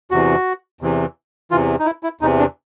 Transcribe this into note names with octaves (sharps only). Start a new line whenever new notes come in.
E2 C3 E3 F#4
E2 C3 E3
E2 C3 E3 F4
D#4
E4
E4
E2 C3 E3 D#4
D4